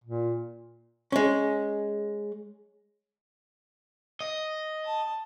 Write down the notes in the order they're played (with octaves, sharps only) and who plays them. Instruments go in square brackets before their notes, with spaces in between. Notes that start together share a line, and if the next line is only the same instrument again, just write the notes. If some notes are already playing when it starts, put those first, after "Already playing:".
[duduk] A#2
[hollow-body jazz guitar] G#3 C#4
[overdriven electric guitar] D#5
[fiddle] A5